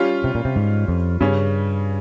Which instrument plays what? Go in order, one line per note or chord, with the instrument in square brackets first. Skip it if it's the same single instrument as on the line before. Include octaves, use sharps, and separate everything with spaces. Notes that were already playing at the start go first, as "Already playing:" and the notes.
Already playing: [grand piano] G3 C#4 F4
[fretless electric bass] C3
A#2
C3
G#2
F2
[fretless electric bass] G2 [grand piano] C#3 G3 C#4